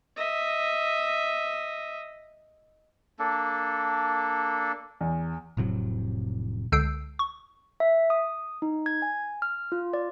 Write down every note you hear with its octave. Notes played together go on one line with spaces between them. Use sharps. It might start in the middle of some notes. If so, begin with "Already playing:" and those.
D#5 E5
A#3 D4 A4
E2
F1 A2 C3 F#3
C#2 D3 E6 G6 C7 D7
C#6
E5
D#6
D#4
G#6
G#5
F6
F4
D5